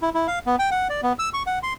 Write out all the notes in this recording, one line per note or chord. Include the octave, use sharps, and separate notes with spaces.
E4
E4
F5
B3
G5
F#5
D5
B3
E6
C#6
F#5
C6